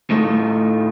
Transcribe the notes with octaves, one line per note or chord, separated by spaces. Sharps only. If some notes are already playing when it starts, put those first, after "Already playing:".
A2 A3 D#4 F4